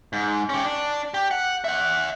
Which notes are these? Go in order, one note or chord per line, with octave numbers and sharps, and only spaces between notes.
G#2
C#4 G4
D4
G4
F#5
E5 F#5